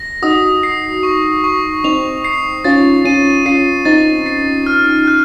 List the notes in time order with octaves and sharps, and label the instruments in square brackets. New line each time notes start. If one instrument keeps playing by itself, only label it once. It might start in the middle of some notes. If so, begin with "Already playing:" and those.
Already playing: [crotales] A#6
[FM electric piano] D#4 F#4 [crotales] D#6
[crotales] C7
C#6
C#6
[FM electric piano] C4 D#4 [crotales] F7
[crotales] C7
[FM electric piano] C#4 F4 [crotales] A6
[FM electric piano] C#4 F4 [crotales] D#7
[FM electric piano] C#4 F4 [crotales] C7
[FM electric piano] C4 D#4 [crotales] A6
[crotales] C7
F6
F#6